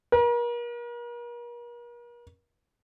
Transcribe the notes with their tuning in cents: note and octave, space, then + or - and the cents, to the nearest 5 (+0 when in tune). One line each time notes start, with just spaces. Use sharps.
A#4 +40